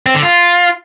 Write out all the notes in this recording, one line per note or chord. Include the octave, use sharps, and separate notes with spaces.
C4
D3
F4